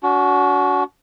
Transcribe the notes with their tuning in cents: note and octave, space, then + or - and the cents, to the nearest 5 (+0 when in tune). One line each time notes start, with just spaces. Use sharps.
D4 -45 F#4 +0